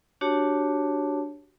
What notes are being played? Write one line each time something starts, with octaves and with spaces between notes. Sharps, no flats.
D4 F#4 G4 C#5 A5